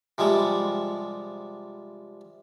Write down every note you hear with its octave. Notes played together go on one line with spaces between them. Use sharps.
C3 F3 G3 G#3